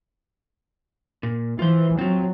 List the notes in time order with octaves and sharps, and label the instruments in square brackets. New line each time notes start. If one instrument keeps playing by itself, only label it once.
[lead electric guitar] A#2
[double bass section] E3 [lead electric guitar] F4 C5
[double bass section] F#3 [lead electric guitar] C4 F4